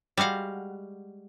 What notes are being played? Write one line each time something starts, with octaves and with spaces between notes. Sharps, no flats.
G3 G#3 F#4 F5 F#5